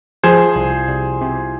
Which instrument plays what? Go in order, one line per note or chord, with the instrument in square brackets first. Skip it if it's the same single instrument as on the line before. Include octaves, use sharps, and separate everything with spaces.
[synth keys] F3 [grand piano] G#4 C5
[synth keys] C2
C2
C3